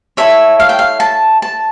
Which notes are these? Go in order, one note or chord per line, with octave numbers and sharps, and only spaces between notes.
E4 A4 C#5 E5
F5
G5
F5
A5
A5